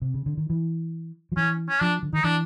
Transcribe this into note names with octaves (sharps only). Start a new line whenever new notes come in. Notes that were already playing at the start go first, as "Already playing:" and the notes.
C3
C#3
D3
D#3
E3
F3
E3 C#4
C#4
F3 D4
D3
D#3 D#4
E3 D4